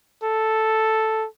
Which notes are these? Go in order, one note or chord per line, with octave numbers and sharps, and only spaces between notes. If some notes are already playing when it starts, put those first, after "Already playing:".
A4